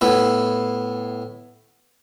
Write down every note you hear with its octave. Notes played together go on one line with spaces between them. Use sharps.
A2 B3 E4